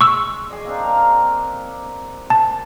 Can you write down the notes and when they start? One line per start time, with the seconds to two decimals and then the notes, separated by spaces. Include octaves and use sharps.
0.01 G#3 C#6 E6
0.50 G#4 D5 D#5
0.65 A#3 C4 D4
0.83 G4 A#4 F5
2.30 A5